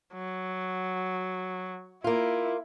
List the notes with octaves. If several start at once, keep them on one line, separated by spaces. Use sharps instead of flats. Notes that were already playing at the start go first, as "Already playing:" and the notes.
F#3
A#3 E4 F4